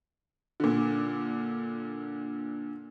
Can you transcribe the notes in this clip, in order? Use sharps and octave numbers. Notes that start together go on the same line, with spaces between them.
A#2 D3